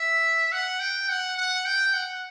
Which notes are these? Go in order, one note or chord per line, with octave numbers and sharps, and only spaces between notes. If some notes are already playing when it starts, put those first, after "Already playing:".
Already playing: E5
F#5
G5
F#5
F#5
G5
F#5